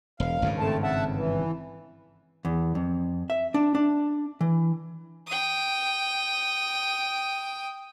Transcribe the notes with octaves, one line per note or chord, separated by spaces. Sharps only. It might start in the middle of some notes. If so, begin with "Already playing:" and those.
E1 F5
G#1 G2 C#3
A3 C4 A5
E5 F#5 A5
E3
E2
F2
E5
D4
D4
E3
G5 D#6